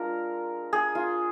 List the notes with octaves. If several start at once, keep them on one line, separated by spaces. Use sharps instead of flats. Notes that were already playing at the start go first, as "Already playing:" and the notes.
Already playing: G#3 D4 F4 A#4
G#4
F4